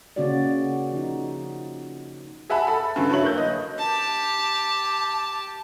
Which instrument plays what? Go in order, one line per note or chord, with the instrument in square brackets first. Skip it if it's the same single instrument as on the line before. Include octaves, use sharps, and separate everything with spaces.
[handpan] C#3 A#3 C#4 F#4 C#5 D5
F3 D#4
[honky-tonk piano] G#4 E5 F#5 A5 B5
A4 B5
G2 C#3 E3
G2 F#3 E4 C#5 F#7
D3 A#3 F#6 G6
D#5
[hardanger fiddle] G4 A5